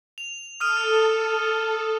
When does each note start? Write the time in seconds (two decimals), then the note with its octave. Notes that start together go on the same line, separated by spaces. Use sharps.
0.18 F7
0.60 A4 D#6 F6 D#7